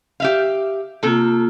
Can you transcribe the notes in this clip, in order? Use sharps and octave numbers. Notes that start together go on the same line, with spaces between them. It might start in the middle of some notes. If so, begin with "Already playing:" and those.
G4 E5 F5
C3 A#3 F4 A4